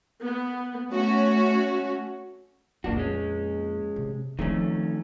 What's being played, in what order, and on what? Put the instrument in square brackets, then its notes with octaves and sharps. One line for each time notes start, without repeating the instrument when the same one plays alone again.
[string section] B3
A3 C#4 F#4
[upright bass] F2 A#2 [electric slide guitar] A#3 D4 F#4
[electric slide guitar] G#3 C#4
[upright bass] C3
[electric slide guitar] D#3 A3 C#4 [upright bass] F3 C4